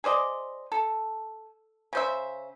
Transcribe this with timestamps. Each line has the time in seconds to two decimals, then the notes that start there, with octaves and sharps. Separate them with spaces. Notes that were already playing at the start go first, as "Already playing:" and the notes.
0.04 G#4 C5 D5 D#5
0.72 A4
1.93 C#3 C5 E5